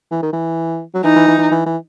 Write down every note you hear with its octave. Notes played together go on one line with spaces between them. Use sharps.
E3
D#3
E3
F#3
E3 D#4
E3
E3
E3
E3
E3